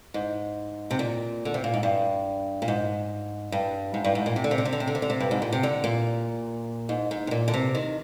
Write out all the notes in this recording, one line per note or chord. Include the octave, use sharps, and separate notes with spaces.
G#2
C3
A#2
D3
C3
A#2
G#2
G2
A#2
G#2
G2
G#2
G2
G#2
A#2
C3
D3
C3
D3
C3
D3
C3
D3
C3
D3
C3
G2
G#2
A#2
C3
D3
A#2
G#2
G#2
C3
A#2
D3
C3
D#3